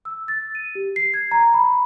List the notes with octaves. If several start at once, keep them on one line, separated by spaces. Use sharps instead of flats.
E6
A6
D#7
G4
C7
G#6
A#5
B5